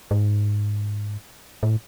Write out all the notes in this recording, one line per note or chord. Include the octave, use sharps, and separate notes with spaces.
G#2
A2